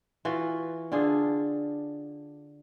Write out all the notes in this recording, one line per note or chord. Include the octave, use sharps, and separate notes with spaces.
E3 F4 F#4
D3 D4 F4 G#4